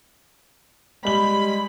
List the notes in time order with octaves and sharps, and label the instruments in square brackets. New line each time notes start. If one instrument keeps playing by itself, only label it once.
[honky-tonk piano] G3 F#7 [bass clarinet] G#3 [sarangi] B5